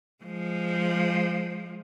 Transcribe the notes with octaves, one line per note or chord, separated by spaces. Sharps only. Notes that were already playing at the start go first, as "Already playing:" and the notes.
F3 G#3